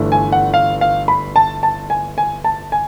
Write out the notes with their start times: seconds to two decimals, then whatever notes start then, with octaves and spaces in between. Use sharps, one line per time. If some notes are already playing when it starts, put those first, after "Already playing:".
Already playing: G1 G2 E3 A3 D4
0.12 G#5
0.32 F#5
0.54 F5
0.81 F5
1.08 B5
1.36 A5
1.63 A5
1.90 G#5
2.18 G#5
2.44 A5
2.72 G#5